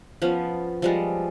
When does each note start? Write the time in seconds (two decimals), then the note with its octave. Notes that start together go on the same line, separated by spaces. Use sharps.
0.22 F3 B3 C#4
0.82 F3 G3 G#3